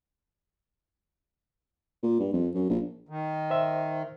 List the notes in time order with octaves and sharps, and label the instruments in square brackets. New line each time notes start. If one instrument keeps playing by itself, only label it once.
[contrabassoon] A#2
G2
F2
F#2
A#1
[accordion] D#3
[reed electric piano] C5 E5